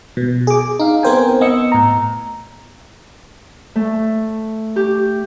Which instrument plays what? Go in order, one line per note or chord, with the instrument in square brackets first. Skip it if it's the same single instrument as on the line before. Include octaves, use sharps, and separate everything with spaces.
[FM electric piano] B2
G#4 D6
D#4 F5
B3 C4 A#4 C5 G5 G#5
B3 D#5 E6 C#7
A2 A#5
[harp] A3
G4